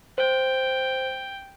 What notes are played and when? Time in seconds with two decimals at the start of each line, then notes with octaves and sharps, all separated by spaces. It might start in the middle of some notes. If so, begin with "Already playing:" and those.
0.18 C5 G5